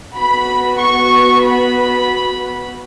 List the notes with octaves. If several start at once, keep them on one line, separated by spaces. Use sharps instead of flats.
B3 F#4 B5
C#6
B5